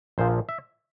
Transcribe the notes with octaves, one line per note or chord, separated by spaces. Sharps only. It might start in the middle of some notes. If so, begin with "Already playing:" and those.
A#1 A#2 F3 C5
E5